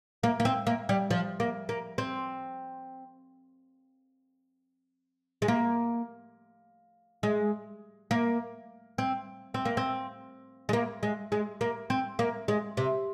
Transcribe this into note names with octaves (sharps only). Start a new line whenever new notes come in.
A#3
A#3
C4
A#3
G3
F3
A#3
A#3
C4
G#3
A#3
G#3
A#3
C4
C4
A#3
C4
G#3
A#3
G#3
G#3
A#3
C4
A#3
G#3
C3